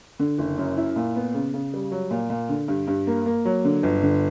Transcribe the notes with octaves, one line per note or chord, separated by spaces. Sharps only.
D3
F#1
F#2
E4
A#2
B3
C#3
C#3
G3
F#3
A#2
A#2
D3
G2
G2
A#3
A#3
F#3
D3
G1
D3